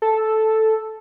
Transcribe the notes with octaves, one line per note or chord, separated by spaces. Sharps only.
A4